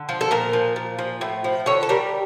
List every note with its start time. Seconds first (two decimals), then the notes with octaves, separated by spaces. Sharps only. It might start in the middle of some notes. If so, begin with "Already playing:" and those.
Already playing: D3
0.09 F3
0.21 A4
0.31 A#2 A#4
0.53 F3
0.76 A#2
0.99 F3
1.21 A2
1.44 F3
1.66 D3 C#5
1.83 A4
1.89 G3 A#4